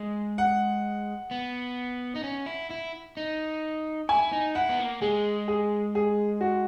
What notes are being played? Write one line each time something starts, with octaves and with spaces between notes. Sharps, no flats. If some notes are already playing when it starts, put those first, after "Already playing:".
Already playing: G#3
F#5
B3
D#4
C#4
E4
E4
D#4
E4 G#5
D#4
E4 F#5
B3
A#3
G#3 G#4
G#4
G#4
F#4